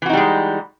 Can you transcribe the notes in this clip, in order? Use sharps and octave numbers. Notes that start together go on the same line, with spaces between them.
E3 G3 G#3 D#4 F#4